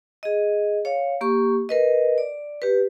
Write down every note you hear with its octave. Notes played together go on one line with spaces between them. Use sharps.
G#4 D#5
C#5 F5
A#3 G4 C#6
A#4 B4 D#5
D5
G4 B4